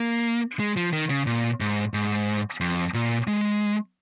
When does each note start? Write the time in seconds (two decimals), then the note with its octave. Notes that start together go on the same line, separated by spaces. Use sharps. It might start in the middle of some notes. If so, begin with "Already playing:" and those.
Already playing: A#3
0.60 G#3
0.77 F3
0.93 D#3
1.10 C#3
1.27 A#2
1.60 G#2
1.94 G#2
2.61 F2
2.94 A#2
3.27 G#3